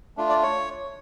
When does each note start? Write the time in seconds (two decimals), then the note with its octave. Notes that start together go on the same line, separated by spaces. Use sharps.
0.17 A3 D4 F4
0.29 D5
0.43 C#5